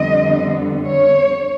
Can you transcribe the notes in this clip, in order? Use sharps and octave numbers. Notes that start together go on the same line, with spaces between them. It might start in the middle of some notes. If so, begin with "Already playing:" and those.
Already playing: F2 D3 G3 B3 D#5
C#5